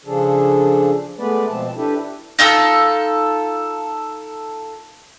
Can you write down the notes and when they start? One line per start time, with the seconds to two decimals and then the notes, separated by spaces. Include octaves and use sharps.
0.06 C#3 F3 D4 G#4 A4
1.18 G#3 A3 B3 B4 D5
1.48 B2 F3 C4 A5
1.76 D4 E4 G4 A4 B4
2.39 D#4 F4 A4 E6